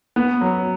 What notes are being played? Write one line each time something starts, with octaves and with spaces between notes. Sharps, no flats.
B3
F#3